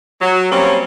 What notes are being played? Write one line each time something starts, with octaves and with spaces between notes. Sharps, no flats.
F#3
G3 A#3 C4 C#4